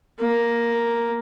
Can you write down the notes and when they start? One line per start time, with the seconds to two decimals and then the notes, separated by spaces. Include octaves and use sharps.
0.19 A#3